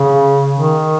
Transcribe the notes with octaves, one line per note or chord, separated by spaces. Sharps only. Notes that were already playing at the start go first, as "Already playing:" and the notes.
Already playing: C#3
D#3